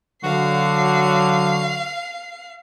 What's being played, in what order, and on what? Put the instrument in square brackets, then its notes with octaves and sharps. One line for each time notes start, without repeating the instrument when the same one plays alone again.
[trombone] D3 [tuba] F#3 [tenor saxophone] F#4 [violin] F5 C7